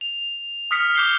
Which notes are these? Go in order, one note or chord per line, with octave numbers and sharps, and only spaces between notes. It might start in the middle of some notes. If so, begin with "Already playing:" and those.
F7
D#6 F6 B6 C#7
D6 G6 C7 G7